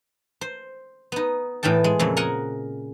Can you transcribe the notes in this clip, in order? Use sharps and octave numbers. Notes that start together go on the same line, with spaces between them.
C5
B3 D#4
A2 E3 B3 G5 A5
G#3
F2 A#2 C#3 A3
A#4 D#5 F#5 G#5